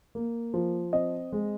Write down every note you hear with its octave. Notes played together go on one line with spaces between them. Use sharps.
A#3
F3
C4 D#5
G#3